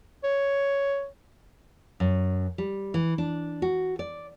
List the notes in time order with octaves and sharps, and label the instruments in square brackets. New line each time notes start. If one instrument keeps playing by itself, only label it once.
[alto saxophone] C#5
[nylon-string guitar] F#2
G3
E3
D4
F#4
D5